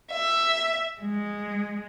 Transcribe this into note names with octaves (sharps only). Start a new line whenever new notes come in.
E5
G#3